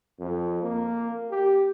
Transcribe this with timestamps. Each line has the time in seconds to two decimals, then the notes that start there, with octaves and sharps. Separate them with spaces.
0.19 F2
0.63 A#3
1.31 G4